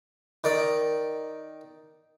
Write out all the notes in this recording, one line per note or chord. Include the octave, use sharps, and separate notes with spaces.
D#3 D5